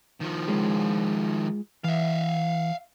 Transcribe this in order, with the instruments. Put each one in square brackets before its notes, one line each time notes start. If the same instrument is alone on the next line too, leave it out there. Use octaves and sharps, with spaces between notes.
[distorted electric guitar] D#3 F3
[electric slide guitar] G#3 F4 G#4
[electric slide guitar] E3 [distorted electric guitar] E5 F5